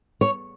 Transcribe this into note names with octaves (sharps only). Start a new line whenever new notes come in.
C#5